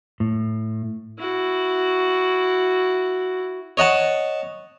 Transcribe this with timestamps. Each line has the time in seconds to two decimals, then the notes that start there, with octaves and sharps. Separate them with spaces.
0.20 A2
1.19 E4 F#4
3.77 C#5 D#5 F#5 A5